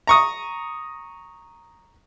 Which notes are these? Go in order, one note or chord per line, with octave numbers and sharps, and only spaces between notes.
A#5 C#6 D#6